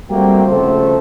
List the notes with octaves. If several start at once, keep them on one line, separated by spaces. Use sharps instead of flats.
G3 A3 A#3 C4 F#4 G5
C#3 F3 A3 A4 C5